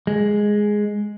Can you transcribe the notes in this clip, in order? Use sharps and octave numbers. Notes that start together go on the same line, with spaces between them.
G#3